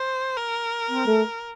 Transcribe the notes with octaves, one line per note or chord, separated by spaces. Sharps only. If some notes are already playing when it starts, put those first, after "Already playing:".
Already playing: C5
A#4
C4
A3